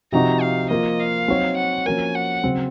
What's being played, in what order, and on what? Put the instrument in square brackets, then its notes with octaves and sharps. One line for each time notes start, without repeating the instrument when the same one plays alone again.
[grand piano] C3 F3 C4 D#4 F#4 [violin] A#5
[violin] F5
[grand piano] F3 A#3 F4 [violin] D#5
[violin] F5
[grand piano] F#3 C4 D#4 F#4 C#5
[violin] F#5
[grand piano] F3 A#3 C#4 F#4 A#4 [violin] G#5
[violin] F#5
[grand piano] C#3 F#3 C4